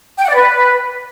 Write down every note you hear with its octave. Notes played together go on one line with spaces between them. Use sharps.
G5
F#5
D5
B4